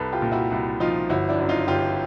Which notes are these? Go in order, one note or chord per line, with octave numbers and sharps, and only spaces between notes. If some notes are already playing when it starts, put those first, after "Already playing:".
Already playing: C2 A4 B4
F4 G4
A#2
E4 F#4
C2 E4 F#4
F3 D#4 F4
G1 E4 F#4
D4 E4
F#2
D#4 F4
G1 F4 G4